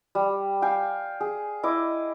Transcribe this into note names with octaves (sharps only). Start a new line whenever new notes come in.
G3
F5 G5 G#5
G#4
E4 D#5 D6